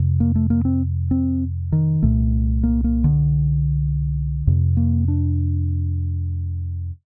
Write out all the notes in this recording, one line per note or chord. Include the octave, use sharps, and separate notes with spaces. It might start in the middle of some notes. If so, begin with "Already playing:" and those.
Already playing: F2 C3
A#3
A3
A#3
C4
C4
D#3
C2 A#2 A3
A#3
A#3
D3
F2 C3
A#3
D4